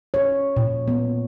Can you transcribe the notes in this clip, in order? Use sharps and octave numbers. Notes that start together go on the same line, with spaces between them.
C#5
A#2
B3